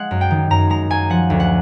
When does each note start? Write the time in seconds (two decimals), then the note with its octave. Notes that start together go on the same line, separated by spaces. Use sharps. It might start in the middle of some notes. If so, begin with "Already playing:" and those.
Already playing: G#3 F#5
0.11 F#2
0.21 G5
0.31 D#3
0.50 F#2 A#5
0.70 G#3 A#5
0.90 F#2 G#5
1.10 F3 F#5
1.30 D2
1.40 F#5